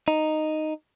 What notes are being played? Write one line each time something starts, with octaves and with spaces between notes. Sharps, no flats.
D#4